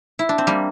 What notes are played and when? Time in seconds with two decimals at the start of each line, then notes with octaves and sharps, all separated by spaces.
0.19 E4
0.29 D4
0.38 C4
0.47 G3 A#3